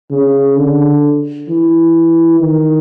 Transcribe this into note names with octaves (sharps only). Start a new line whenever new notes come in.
C#3
D3
E3
D#3